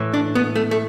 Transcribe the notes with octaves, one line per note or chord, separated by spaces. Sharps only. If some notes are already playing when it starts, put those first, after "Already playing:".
Already playing: A2 E3
D4
B3
A3
A3